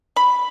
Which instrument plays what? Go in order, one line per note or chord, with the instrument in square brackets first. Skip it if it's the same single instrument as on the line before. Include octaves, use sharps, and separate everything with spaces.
[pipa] B5